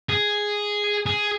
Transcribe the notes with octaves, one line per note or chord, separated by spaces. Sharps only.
G#4
G#4